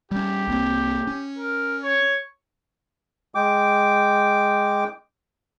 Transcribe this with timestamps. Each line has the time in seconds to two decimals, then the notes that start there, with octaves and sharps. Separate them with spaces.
0.11 G3 C#4 G4
0.47 C2 A#3 C4
1.07 C#4
1.38 A#4
1.82 C#5
3.35 G#3 G5 D6